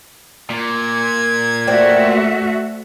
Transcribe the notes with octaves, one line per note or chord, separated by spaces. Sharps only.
A#2 G#6
A3 F#4 C5 D5 E5 G5